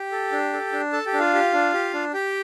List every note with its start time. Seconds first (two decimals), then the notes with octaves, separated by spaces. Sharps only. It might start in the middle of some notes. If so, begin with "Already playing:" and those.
Already playing: G4 G5
0.12 A4
0.32 D4
0.53 A4
0.72 D4
0.92 A4 A5
1.06 G4 G5
1.14 D4
1.19 F4 F5
1.34 G4
1.53 D4
1.74 G4
1.94 D4
2.14 G4 G5